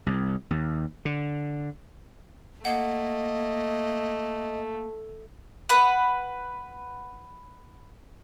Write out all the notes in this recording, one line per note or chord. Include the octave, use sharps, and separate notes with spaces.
C2
D#2
D3
A3 A#3 D#5 F#5
B4 F#5